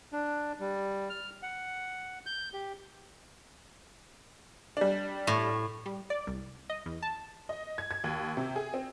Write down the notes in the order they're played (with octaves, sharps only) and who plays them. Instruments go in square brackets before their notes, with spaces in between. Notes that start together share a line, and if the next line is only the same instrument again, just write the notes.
[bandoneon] D4
G3
F6
F#5
G6
G4
[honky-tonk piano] G3 D4
[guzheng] A2
[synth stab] G3
D5
C2
D#5
E2
A5
[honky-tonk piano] D#5
G#6
G#6
D#2
C3
G#4
C4